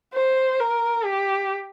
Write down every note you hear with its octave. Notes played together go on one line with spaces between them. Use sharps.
C5
A#4
G4